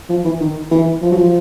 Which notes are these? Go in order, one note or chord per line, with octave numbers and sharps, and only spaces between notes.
F3
E3
D#3
E3
F3
F#3
F3